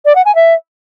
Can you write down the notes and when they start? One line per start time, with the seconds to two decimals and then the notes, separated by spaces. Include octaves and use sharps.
0.05 D5
0.15 F#5
0.25 G#5
0.35 E5